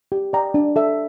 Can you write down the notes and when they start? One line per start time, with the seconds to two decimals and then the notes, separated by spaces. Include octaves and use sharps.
0.12 G4
0.33 D5 G5 A#5
0.54 D4
0.76 A4 E5